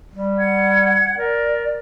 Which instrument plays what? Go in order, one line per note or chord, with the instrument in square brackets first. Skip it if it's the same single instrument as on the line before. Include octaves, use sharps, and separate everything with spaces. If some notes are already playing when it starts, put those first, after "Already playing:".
[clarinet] G3
[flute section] F#5 G#6
[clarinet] A#4 [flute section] D5